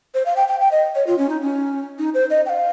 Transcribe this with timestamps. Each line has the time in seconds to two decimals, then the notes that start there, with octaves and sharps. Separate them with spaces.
0.14 C5
0.26 F5
0.36 G5
0.48 G5
0.61 G5
0.71 D#5
0.95 C#5
1.07 F4
1.18 C#4
1.29 D#4
1.41 C#4
1.99 D#4
2.14 C5
2.30 D#5
2.46 G5
2.49 F5